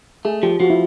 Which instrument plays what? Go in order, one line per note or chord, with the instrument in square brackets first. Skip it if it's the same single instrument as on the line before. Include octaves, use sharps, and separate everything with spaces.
[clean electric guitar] A3 [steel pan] G#4
[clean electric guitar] F3 [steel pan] G4
[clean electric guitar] F3 [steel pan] F#4
[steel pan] E4